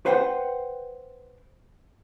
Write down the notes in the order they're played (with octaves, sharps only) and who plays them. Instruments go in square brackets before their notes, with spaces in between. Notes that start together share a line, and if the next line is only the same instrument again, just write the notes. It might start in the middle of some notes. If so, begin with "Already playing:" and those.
[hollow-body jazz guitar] B4 C5 F#5 G5